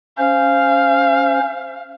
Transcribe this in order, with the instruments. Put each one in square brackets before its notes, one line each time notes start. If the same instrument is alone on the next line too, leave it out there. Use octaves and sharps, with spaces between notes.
[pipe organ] C#4 C5 [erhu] F5